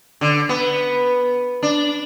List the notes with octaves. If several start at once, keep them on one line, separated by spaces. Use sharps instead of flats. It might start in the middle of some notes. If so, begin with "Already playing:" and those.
D3
B3
D4